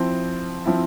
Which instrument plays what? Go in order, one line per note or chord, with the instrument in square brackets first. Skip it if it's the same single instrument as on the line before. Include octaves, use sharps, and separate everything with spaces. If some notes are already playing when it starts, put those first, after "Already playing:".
Already playing: [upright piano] F3 C4 E4
F3 C4 E4